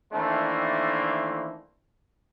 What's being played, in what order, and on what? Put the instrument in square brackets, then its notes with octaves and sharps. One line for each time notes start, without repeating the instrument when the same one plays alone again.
[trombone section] D#3 E3 A3 A#3 C4 D4